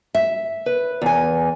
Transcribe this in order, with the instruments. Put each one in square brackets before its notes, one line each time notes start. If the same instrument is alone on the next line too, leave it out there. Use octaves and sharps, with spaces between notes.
[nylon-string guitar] E5
[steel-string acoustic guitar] B4
E2 G#5